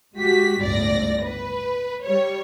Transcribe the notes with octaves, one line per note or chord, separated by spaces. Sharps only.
G#3 F#4 G4 B6
G1 C#2 A2 D5 A#6
B4
G3 C#5